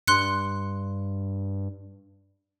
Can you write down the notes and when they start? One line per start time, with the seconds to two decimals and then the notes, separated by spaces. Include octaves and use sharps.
0.07 G2 C6 F#6 C#7